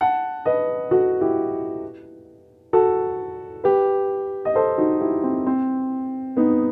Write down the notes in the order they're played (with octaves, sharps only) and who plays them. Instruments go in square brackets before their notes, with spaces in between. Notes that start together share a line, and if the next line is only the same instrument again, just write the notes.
[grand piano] F#5 A5
B4 D#5
F#4 A4
E4 G4
F#4 A4
G4 B4
D#5
A4 C5
D#4 F#4
E4 G4
C4
C4
B3 D#4